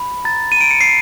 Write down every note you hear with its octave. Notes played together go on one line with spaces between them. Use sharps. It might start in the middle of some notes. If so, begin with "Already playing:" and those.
Already playing: B5
A#5 A6
D#7
A#5 D7
C#7
C7